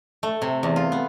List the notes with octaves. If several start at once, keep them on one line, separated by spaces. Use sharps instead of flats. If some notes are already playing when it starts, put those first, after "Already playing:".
A3
C3
E2
F4
B3